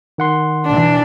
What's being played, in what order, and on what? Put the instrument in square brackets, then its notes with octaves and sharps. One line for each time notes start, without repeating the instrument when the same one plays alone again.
[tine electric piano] D#3 F#5 C6
[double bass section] B2 E3 [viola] D4